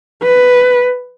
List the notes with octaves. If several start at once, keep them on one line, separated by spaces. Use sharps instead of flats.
B4